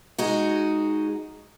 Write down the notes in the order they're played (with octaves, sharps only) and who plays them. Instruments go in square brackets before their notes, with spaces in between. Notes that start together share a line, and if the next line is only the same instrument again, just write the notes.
[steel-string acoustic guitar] G#3 D#4 F#4